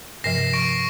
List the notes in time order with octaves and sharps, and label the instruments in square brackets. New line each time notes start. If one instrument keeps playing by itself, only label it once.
[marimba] G2 C3 F3 [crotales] A#6 C7 E7
[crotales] C#6 A#6 D7